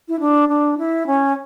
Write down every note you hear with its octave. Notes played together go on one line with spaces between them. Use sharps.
E4
D4
D4
E4
C#4